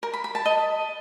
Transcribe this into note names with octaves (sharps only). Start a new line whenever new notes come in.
A#4
B5
B5
A5
D#5